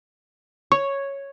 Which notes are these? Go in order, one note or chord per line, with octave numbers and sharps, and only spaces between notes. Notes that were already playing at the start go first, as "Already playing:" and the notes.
C#5 C#6